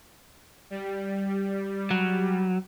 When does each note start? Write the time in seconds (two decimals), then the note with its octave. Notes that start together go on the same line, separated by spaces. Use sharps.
0.70 G3
1.91 F#3